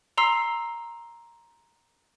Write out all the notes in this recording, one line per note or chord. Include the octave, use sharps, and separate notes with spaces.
A#5 C6 E6 C7